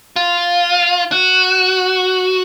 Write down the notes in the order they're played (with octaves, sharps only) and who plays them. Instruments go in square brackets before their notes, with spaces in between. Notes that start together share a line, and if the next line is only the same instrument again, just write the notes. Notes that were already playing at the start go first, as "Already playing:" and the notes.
[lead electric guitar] F4
F#4